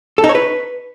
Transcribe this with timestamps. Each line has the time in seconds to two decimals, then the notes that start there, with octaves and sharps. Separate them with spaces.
0.18 A4
0.24 D#4
0.29 C#5
0.35 B4